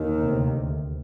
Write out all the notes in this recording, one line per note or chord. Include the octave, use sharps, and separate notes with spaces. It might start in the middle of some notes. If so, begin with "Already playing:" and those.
Already playing: D#2 D#3
D2 C3